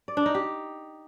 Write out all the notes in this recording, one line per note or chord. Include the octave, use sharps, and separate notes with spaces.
D5
D4
D#4
G4